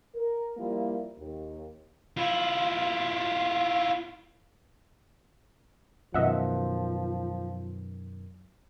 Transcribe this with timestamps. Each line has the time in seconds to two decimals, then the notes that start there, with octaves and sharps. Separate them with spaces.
0.15 A#4
0.57 F3 G3 A#3 E4 F4
1.19 D#2
2.17 E4 F4
6.14 F#2 B2 D#3 F3 D#5 E5 F#5